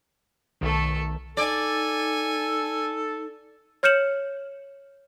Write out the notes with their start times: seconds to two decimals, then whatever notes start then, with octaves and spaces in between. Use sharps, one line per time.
0.61 B1 D#3 A3 A4
1.37 D#4 A4 D5 G#5
3.83 C#5 F6 G6 C#7 E7 F#7